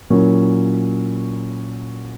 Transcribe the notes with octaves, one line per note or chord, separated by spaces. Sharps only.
A#2 F#3 A#3 C#4 E4